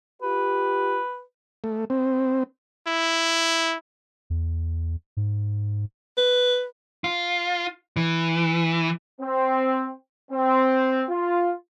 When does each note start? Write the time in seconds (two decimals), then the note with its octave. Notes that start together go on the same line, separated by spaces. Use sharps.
0.22 F4 G4 B4
1.64 A3
1.90 C4
2.87 E4
4.30 E2
5.17 G#2
6.18 B4
7.04 F4
7.97 E3
9.21 C4
10.31 C4
11.09 F4